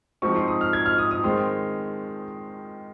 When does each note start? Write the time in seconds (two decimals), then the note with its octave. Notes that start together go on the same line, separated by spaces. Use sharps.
0.22 G#2 F3 C4 D#4 C#6
0.36 C6
0.48 D#6
0.61 F6
0.73 G#6
0.86 F6
0.98 D#6
1.11 D#6
1.23 D#3 G#3 C4 C6